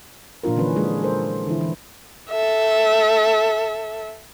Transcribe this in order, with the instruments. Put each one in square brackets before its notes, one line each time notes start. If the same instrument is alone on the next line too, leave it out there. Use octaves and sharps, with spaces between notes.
[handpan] A#2 F3 D4 F4 A#4
D3 E3 F#3 C#4 B4
F3 G#3 D4 G#4
A4 A#4 C5
D3 E3 E4
E3
[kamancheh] A4 E5